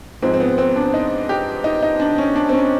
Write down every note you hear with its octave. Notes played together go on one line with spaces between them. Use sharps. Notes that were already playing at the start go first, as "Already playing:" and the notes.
G#2 F3 G#3 C4
C4
B3
C4
D4
D#4
G4
D#4
D#4
D4
C#4
D4
C4
C#4